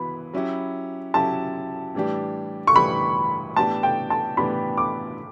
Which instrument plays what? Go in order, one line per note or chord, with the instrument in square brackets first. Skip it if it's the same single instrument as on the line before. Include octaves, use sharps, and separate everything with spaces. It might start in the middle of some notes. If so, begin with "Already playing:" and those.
Already playing: [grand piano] E3 B3 F#4 [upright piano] B5
[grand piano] F#3 C#4 E4 G4
[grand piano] F#3 C#4 E4 G4 [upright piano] A5
[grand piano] A2 E3 G3 D4 G4
[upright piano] C#6
[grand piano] A2 E3 G3 D4 G4 [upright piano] B5
[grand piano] A2 E3 B3 D4 G4 [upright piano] A5
[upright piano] G5
A5
[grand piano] A2 E3 B3 D4 G4 [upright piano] B5
[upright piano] D6